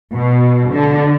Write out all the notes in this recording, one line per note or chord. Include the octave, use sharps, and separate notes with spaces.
B2
D3